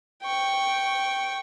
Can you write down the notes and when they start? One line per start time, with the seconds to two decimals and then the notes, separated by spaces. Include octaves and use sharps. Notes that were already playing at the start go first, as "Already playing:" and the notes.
0.23 G5 C#6